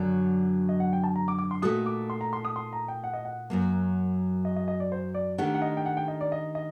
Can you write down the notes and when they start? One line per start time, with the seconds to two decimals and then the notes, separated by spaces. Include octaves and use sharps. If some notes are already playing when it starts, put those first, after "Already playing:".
Already playing: F#2 D3 F#3 D5
0.69 D#5
0.80 F#5
0.93 G5
1.04 A5
1.16 A#5
1.28 D6
1.38 D6
1.51 C6
1.62 A#2 A3 D#4 F#4 A4 D#6
1.86 D6
2.10 C6
2.21 A#5
2.33 C6
2.45 D#6
2.56 C6
2.73 A#5
2.88 G5
3.04 F#5
3.13 D#5
3.25 F#5
3.50 F#2 F#3 A#3
4.45 D#5
4.57 D#5
4.68 D#5
4.80 D5
4.92 C5
5.14 D5
5.38 D#3 A3 D4 G4 F#5
5.55 F#5
5.62 D#5
5.77 G5
5.86 F#5
5.97 G5
6.08 D#5
6.21 D5
6.32 D#5
6.55 D#5